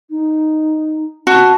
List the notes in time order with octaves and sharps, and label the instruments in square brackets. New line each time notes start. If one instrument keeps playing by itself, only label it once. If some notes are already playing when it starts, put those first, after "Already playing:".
[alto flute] D#4
[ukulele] F#4 [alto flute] A5